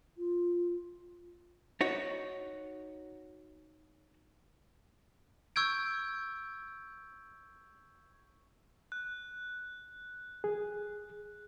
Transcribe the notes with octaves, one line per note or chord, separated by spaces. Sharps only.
F4
D#4 F#4 C#5
C#6 E6 G6 G#6 D7
F#6
G#4